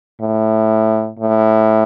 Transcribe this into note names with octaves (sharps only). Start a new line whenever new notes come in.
A2
A2